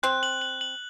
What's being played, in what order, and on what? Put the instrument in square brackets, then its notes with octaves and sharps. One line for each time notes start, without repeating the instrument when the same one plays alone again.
[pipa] C4 [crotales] F#6
[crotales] F#7
F#7
F#7